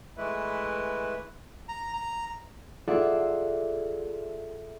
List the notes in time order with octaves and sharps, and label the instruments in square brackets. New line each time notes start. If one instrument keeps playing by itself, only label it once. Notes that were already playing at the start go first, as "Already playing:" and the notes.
[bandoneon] E3 G#3 A3 E4 B4
[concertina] A#5
A#5
[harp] F4 G#4 A4 D5 E5 F#5